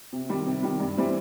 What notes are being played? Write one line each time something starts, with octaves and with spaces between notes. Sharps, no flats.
C3
D#3 G3
C3
D#3 G3
G2
E3 G3 C4 E4